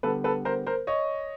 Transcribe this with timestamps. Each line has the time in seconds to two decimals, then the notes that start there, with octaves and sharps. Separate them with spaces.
0.03 D3 G3 B3 A4 B4
0.24 A4 B4
0.45 A#4 C5
0.67 A#4 C5
0.87 C#5 D#5